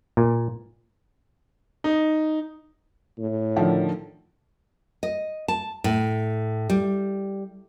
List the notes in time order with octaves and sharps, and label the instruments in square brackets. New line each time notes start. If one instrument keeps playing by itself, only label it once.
[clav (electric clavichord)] A#2
[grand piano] D#4
[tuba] A2
[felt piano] D3 D#3 F3
[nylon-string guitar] D#5
A5
A2
G3